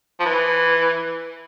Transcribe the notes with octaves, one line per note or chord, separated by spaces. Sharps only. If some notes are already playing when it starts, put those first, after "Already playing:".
F3
E3